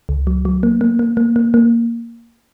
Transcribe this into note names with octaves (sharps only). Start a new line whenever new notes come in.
C#2
F#3
F#3
A#3
A#3
A#3
A#3
A#3
A#3